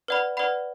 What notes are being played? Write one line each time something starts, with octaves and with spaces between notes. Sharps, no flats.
B4 D5 F#5 B5
B4 D5 F#5 B5